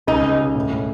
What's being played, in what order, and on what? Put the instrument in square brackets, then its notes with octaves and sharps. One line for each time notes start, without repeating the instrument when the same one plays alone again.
[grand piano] C#2 [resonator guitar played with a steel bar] D#4
[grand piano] C#2
C#3
A2
A2